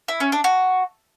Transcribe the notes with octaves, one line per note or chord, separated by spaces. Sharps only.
E4
C#4
D4
F#4